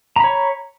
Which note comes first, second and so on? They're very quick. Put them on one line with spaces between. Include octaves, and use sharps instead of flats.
A#5 B5 C#5